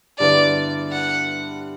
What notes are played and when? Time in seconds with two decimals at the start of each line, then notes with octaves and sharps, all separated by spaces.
0.19 G2 D3 G3 B3 E4 D5
0.92 F#5